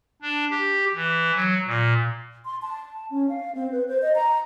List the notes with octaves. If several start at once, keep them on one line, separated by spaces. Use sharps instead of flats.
D4
G4
E3
F#3
A#2
C6
A5
C#4
F5
C4
B4
C5
D#5
A#5